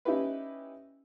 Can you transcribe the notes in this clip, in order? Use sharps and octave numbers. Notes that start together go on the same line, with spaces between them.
C#4 D#4 E4 G4 B4